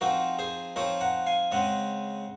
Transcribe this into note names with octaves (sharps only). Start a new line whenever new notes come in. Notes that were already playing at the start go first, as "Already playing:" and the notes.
F3 C4 D#4 F#4 A#4
G#4 C5
F3 C4 D#4 A#4 C#5
F#5 A#5
F5 G#5
C#3 G#3 C4 D#5 F#5